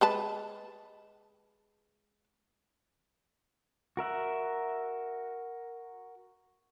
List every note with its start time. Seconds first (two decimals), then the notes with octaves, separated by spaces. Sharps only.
0.01 G#3 B4 A5
3.97 F#4 A#4 E5 F#5